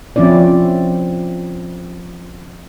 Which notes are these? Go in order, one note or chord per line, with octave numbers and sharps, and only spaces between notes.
F3 C4 C#4 E4 D5